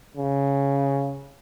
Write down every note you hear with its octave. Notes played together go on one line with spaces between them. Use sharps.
C#3